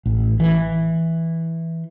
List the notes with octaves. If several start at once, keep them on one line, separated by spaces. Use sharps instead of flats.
A1
E3